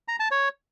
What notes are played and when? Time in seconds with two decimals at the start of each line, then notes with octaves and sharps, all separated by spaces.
0.08 A#5
0.20 A5
0.31 C#5